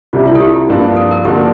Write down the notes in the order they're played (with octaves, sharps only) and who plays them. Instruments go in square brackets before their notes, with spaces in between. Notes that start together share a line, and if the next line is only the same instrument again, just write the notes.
[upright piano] C2 C3 G3 D4 [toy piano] F4
[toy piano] E4
A4
G4
[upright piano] G2 F3 A#3 D4 F4
[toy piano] A4
A#4
[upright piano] D3 F3 A#3 D4 F4 [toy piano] G4